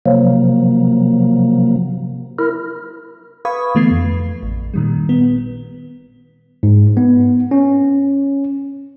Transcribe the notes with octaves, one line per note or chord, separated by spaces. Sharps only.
C3 F3 F#3 A#3
E4 A#4
B4 F5 B5 C#6 D#6 G#6
D3 E3 A3 B3 G#6 C7
F2
A1
A#2 D#3 G3
B3
G#2
B3
C#4